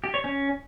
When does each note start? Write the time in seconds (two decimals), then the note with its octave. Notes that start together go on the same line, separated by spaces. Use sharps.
0.04 G4
0.14 C#5
0.24 C#4